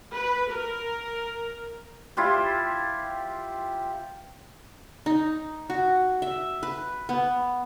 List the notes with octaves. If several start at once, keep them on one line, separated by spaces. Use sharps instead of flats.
B4
A#4
E4 F4 G4 C5
D#4
F#4
E5
B4
B3